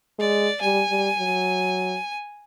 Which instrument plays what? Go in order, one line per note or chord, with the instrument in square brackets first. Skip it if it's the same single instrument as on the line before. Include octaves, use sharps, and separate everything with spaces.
[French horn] G#3 [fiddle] D5
[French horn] G3 [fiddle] G#5
[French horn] G3
F#3